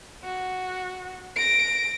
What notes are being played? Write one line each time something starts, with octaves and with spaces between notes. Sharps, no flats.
F#4
A#6 D7